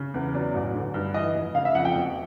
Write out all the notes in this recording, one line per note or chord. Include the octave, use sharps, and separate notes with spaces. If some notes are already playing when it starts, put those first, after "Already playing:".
Already playing: C#3
E2
F#3 D5
A1
D3
G2
E3 D#5
F1
C#3 F5
E5
F2 F#5
G5
E1